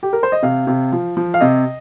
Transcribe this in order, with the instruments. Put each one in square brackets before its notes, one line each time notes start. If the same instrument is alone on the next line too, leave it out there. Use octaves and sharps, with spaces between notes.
[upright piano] G4
A#4
C5
D#5
C3 F5
C3
F3
F3
F5
C3 D#5